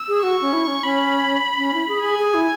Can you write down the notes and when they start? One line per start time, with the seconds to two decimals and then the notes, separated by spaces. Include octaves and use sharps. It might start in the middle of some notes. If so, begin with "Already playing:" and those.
Already playing: E6
0.08 G#4
0.23 F#4 C#6
0.42 C#4
0.53 E4
0.67 C#4
0.83 C#4 B5
1.58 C#4
1.74 E4
1.88 G#4
2.03 G#4 G#5
2.19 G#4
2.34 E4